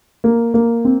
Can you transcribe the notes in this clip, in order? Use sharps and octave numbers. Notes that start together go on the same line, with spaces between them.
A#3
A#3
C4